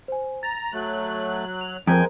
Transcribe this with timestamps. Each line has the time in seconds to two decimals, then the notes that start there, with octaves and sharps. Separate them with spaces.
0.08 C5 G#5
0.43 A#5 A6
0.73 F#3 A3 F#6
1.61 F7
1.87 F2 G#3 A#4 C5 G5 G#5 A#5